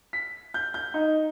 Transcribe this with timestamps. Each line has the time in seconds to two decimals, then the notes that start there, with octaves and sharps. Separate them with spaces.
0.13 B6
0.54 G6
0.74 G6
0.94 D#4